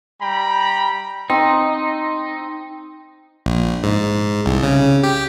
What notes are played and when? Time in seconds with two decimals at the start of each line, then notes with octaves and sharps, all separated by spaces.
0.22 G3 G5 A#5 B5
1.30 C4 D#4
3.46 A#1
3.83 G#2
4.46 C2
4.63 C#3
5.03 G4